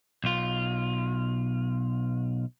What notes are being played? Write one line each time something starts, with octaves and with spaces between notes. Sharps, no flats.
B1 F4